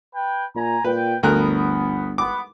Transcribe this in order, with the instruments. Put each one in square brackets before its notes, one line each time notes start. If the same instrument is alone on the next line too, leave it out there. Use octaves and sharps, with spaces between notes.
[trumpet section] B4 G5
[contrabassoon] A#2 [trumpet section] G#5 A#5
[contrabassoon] A#2 [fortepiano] B4 [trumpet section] G5
[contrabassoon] G1 [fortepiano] D2 A#4 F#6 [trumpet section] B3
[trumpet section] B3 [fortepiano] D6